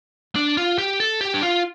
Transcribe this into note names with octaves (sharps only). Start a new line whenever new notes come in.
D4
F4
G4
A4
G4
D4
F4